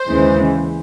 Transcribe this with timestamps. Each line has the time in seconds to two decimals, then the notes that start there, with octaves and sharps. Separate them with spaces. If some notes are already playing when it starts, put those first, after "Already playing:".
Already playing: C5
0.09 D#2 C#3 E3 G#3